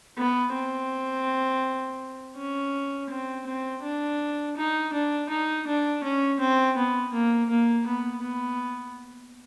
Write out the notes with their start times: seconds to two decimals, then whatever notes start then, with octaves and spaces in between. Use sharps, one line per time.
0.17 B3
0.54 C4
2.36 C#4
3.10 C4
3.46 C4
3.83 D4
4.57 D#4
4.93 D4
5.29 D#4
5.67 D4
6.03 C#4
6.40 C4
6.77 B3
7.13 A#3
7.50 A#3
7.87 B3
8.23 B3